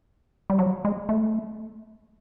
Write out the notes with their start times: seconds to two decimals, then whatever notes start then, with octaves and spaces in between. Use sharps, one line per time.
0.50 G3
0.59 F#3
0.85 G#3
1.09 A3